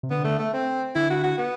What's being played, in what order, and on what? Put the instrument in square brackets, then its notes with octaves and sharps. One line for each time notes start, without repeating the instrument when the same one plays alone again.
[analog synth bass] C3
[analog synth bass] D3 [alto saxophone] B3
[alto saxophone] A3
A3
C4
[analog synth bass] D3 [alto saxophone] E4
[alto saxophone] F#4
F#4
B3